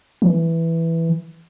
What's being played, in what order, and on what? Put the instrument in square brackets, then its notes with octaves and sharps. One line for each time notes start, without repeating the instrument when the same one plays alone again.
[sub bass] E3